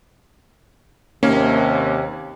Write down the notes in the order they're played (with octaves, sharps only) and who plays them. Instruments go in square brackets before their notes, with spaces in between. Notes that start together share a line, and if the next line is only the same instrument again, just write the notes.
[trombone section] D#2 C3 [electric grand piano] A#3 C#4